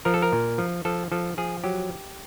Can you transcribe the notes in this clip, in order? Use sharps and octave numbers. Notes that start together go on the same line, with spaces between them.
F3 A#4
A4
A#4
A#2
F3
F3 A4
F3 A4
F3 G#4
F#3 G4